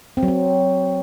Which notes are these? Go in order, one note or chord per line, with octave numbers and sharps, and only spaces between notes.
C4
F#3
C4